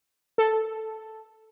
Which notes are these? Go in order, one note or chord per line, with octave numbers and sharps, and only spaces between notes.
A4